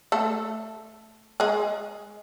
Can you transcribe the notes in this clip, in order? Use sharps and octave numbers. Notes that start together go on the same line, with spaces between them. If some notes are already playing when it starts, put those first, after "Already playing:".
A3 A4
G#3 G#4